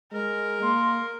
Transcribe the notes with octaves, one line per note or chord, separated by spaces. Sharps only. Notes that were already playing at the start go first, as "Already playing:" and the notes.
G#3 A#4
A#3 C6